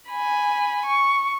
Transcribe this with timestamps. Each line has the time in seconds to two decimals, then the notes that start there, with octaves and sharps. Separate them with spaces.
0.11 G#5 B5
0.86 C#6